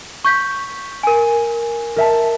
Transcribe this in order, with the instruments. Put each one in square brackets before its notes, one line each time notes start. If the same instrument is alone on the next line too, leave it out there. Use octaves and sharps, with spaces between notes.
[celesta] C#6 G6 B6
A#4 G#5
[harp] A#4 E5 A5